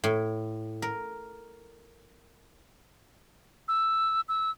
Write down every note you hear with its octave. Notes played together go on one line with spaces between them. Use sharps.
A2
A#4
E6
E6